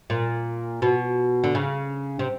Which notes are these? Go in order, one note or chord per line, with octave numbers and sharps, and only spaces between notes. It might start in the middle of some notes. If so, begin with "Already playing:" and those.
A#2
B2
D3
C#3
C3